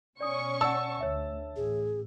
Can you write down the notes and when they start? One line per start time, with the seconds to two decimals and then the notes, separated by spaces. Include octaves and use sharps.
0.21 B2 C#4 D5 C#6 D#6
0.61 D5 F#5 A5 E6
1.00 D2 C#5 E5
1.56 A1 G#4